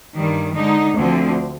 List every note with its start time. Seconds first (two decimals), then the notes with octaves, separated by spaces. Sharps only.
0.17 G2 D#3 G3
0.56 D3 G#3 D#4
0.97 D2 D3 F3 C4